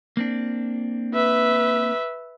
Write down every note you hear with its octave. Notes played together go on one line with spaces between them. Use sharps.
A#3 C4 D4
B4 E5